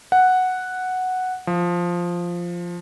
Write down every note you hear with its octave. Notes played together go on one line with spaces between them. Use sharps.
F#5
F3